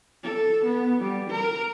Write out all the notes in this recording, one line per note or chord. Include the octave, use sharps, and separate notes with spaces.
A4
B3
G3
A#4